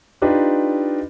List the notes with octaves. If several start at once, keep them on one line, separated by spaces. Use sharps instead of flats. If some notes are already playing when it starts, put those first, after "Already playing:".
D4 D#4 F4 G4 B4